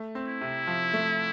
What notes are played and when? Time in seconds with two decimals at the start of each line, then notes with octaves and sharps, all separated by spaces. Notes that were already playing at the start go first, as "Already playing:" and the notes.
Already playing: A3
0.15 C4
0.28 E4
0.41 C3
0.67 F3
0.93 A3